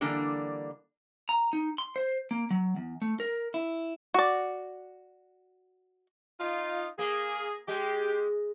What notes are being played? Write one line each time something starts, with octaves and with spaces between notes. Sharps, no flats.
D3 E3 G3 A#3 D4 D5
A#5
D#4
C6
C5
A#3
F#3
E2
A3
A#4
E4
F#4 D5
D#4 F4
A#3 G#4
G#3 G4